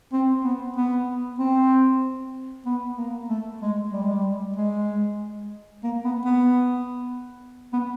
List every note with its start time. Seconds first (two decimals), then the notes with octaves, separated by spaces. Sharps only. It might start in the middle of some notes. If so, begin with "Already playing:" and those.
0.13 C4
0.44 B3
0.76 B3
1.39 C4
2.66 B3
2.98 A#3
3.30 A3
3.62 G#3
3.93 G3
4.02 G#3
4.12 G3
4.56 G#3
5.83 A#3
6.05 B3
6.25 B3
7.73 B3